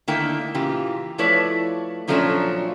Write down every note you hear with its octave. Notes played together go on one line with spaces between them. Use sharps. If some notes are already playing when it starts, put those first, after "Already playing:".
D3 D#3 A3 A#3 E4 G5
A#2 C#3 E3 F4 G4
F3 A3 E4 B4 C#5 D5
A#2 F3 F#3 A3 C#4 D4